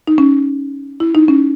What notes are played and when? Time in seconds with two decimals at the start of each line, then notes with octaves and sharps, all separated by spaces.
0.07 D#4
0.18 C#4
1.00 E4
1.15 D#4
1.28 C#4